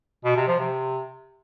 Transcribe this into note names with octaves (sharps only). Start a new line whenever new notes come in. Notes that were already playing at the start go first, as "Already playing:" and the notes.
B2
C3
F3
C3